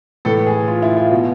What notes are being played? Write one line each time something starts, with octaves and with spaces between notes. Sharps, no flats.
A2 E3 A4
G#4
F4
E4
F4
B2